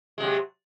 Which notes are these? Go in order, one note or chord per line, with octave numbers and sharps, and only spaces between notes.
C3 F#3 G#3